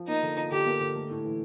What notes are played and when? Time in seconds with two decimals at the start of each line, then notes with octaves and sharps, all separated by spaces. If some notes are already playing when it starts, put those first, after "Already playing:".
Already playing: F3
0.08 A#3 D#4
0.23 D3
0.37 F3
0.51 D3 G4
0.66 A#3
0.81 D3
0.95 A3
1.10 A2
1.25 E3